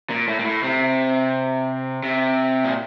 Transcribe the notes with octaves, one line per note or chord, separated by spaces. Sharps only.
A#2
A2
A#2
A2
C3
C3
A#2